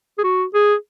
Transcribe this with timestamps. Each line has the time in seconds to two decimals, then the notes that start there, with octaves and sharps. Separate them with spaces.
0.18 G#4
0.24 F#4
0.54 G#4